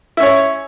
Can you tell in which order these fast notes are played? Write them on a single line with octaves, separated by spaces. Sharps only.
E4 C#4 C#5